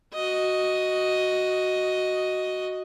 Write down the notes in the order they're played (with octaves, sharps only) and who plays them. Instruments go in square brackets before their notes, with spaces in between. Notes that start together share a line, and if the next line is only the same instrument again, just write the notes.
[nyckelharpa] F#4 D#5